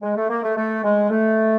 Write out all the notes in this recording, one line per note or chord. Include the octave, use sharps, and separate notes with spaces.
G#3
A3
A#3
A3
A3
G#3
A3